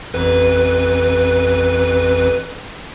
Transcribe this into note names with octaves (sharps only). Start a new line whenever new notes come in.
A1 F2 B4